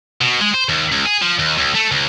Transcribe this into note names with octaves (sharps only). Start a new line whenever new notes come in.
B2
G#3
C5
D#2
C#2
G#4
F3
D#2
C#2
A3
C#2